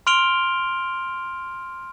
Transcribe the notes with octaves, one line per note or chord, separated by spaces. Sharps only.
C6 F6 D7 F7 G7